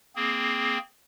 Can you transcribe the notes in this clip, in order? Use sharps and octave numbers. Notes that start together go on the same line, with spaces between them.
A#3 C4 G#4